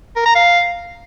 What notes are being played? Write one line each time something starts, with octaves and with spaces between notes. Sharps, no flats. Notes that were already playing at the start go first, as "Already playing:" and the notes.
A#4
A#5
F5